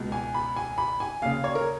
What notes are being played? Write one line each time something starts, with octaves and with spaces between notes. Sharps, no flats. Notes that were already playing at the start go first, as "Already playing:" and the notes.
Already playing: C#2 B2
G#5
B5
G#5
B5
G#5
D#2 C#3 F5
C#5
A#4